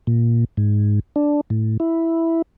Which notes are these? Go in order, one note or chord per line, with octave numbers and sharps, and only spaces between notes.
A#2
G#2
D4
A2
E4